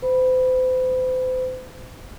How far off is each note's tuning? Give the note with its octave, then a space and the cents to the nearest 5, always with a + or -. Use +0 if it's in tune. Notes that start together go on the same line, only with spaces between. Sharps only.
C5 -40 B5 -5